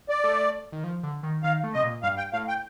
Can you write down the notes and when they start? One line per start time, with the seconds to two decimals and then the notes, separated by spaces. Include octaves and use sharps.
0.09 D5
0.24 A3
0.72 D#3
0.84 F3
1.03 D3
1.23 D#3
1.43 D#3 F5
1.64 A3
1.74 C3 D#5
1.83 A#2
2.03 G2 F5
2.18 G5
2.33 A2 F5
2.49 G5